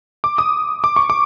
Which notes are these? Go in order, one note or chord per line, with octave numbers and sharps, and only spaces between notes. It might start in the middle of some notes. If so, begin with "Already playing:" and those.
D6
D#6
D6
C#6
D6